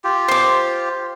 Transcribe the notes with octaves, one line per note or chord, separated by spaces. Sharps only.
F4 G4
C5 D6